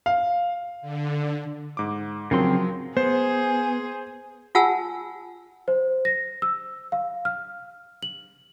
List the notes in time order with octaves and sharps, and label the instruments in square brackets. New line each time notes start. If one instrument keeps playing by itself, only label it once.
[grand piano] F5
[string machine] D3
[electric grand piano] G#2 D6
[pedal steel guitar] C#3 C4 C6 [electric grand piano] F3 F#3 A#4
[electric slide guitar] B3 [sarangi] G#4 [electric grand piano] C5
[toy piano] F4 F#5 G#5 A5 E6
[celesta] C5
A#6
E6
F5
F6
F#7